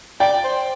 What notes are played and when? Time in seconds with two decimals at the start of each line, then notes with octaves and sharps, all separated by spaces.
0.20 D5 G5
0.44 C5